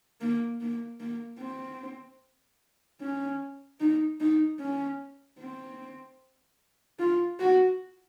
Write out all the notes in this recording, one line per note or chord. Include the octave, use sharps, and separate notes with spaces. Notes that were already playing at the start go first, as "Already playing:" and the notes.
A#3
A#3
A#3
C4
C#4
D#4
D#4
C#4
C4
F4
F#4